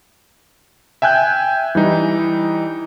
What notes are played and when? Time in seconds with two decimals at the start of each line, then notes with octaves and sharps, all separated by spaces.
1.02 E5 G5 G#5 F#6 G6
1.75 E3 G3 D#4